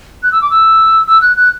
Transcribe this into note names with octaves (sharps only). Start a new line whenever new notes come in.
F#6
E6
D6
E6
E6
F#6
F#6